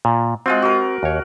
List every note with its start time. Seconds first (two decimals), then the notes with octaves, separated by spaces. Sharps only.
0.05 A#2
0.46 G#3 C4 F4 F#4
0.62 F#4 A#4
1.03 D#2 C#5